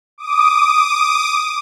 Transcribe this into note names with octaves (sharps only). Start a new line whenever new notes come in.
D6 D#6